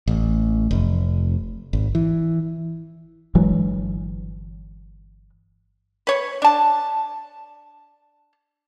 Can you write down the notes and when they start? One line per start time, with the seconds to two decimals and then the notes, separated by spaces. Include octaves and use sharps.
0.08 A1
0.71 F1
1.73 G#1
1.95 E3
3.35 G1 E3 F#3 G#3
6.07 B4 C#5
6.42 D4 A5